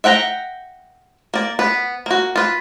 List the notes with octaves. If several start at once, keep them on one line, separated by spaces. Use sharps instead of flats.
E5 F#5 G5 A#5
A#3 D5
B3 B4
A#3 F#4
F4 B4